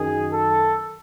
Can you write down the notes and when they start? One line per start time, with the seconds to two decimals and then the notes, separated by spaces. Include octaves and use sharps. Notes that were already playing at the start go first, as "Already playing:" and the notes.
Already playing: F#2 D#3 G#4
0.32 A4